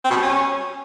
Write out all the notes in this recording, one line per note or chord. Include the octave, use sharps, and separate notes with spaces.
C4
B2
G3
C#4